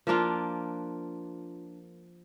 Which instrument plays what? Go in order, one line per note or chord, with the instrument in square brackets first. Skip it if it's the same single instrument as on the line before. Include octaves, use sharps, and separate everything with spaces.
[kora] F3 A#3 D4 F4